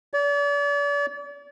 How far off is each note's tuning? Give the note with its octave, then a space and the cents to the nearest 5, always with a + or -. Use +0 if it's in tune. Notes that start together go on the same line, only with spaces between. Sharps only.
D5 -40